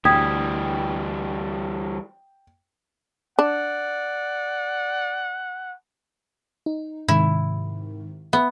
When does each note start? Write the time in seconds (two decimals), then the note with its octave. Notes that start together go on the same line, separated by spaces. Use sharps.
0.05 D2 E3 G3 G5 D#6 G#6 B6
3.39 D4 D5 F#5
6.66 D#4
7.08 G#2 C3 D#3 E4
8.33 B3 E5